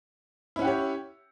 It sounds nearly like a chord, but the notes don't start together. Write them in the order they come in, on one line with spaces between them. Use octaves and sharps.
E4 C#4 F#5 G4 C#5